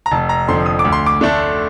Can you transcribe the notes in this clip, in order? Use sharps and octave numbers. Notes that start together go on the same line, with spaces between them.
A#5
F1 A5
A#5
F2 D3 F3 C6
D#6
D6
D2
C6
D6
D3 A3 D4